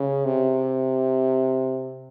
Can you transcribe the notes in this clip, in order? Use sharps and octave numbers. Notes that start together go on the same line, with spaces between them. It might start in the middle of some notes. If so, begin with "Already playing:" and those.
Already playing: C#3
C3